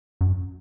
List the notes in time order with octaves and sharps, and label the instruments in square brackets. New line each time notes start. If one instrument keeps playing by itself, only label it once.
[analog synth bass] F#2